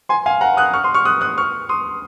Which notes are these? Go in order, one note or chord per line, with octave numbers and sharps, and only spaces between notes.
G#5 C6
F5 G#5
F#5 A#5
D#6 F#6
C#6 F6
C6 D#6
C#6 F6
D#6 F#6
D#6 F#6
C#6 F6
C6 D#6